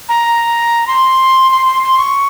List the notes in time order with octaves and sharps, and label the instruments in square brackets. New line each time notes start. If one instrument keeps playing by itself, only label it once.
[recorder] A#5
C6
C6
C6
C6
C#6